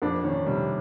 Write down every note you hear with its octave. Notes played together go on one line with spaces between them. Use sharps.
F2 D4
D#3 C#4
C3 G3